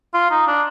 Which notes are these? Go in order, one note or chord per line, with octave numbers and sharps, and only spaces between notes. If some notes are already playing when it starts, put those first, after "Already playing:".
F4
D#4
D4